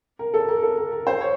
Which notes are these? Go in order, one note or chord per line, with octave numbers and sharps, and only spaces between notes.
A#4
A4
A#4
A4
A#4
A#4
C5
C#5